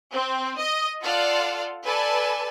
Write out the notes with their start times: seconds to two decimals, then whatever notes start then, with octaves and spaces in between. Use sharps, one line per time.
0.13 C4
0.59 D#5
1.03 F4 A4 D5 F5 F#5
1.86 A4 B4 D5 G#5 A5